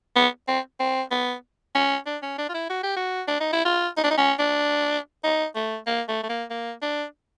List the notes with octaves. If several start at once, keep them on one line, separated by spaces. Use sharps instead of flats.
B3
C4
C4
B3
C#4
D4
C#4
D4
F4
E4
F#4
G4
F#4
D4
D#4
E4
F4
D#4
D4
D#4
C#4
D4
D#4
A3
A#3
A3
A3
A#3
A#3
D4